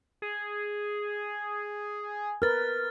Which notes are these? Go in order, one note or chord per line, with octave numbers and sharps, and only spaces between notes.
G#4
A#4 B4 F6 A6